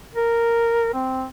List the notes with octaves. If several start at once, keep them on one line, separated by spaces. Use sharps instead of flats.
A#4
C4